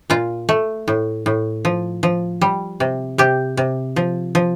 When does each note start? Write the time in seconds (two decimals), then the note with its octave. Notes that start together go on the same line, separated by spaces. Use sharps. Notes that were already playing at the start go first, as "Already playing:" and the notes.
0.10 A#2 F4
0.49 A3
0.88 A2
1.26 A2
1.65 F3
2.03 F3
2.41 G3
2.80 C3
3.18 C3 G4
3.57 C3
3.96 F3
4.35 F3